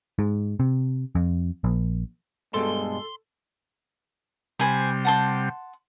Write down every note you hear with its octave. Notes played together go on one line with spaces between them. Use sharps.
G#2
C3
F2
A#1
G2 B2 G3 G#3 A4 C6
C3 G3 C5 G#5 B5
F#5 A5 C6